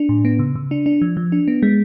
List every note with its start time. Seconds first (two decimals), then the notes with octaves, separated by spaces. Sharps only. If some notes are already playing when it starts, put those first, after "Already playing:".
Already playing: D4
0.09 A2
0.25 B3
0.39 C#3
0.55 C#3
0.71 D4
0.86 D4
1.02 F3
1.17 F3
1.32 D4
1.48 B3
1.63 G#3